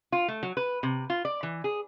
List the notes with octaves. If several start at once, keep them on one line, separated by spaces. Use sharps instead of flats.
F4
A3
F#3
B4
C3
F4
D5
E3
G#4